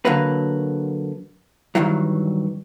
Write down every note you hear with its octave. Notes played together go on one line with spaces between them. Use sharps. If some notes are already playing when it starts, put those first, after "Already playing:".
D3 F#3 A#3 B4
G2 D#3 E3 F#3